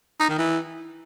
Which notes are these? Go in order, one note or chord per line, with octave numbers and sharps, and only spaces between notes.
D#4
D#3
E3